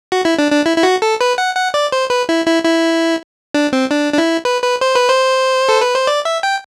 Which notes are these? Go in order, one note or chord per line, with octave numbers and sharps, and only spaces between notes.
F#4
E4
D4
D4
E4
E4
F#4
A4
B4
F#5
F#5
D5
C5
B4
E4
E4
E4
D4
C4
D4
D4
E4
B4
B4
C5
B4
C5
A4
B4
C5
D5
E5
G5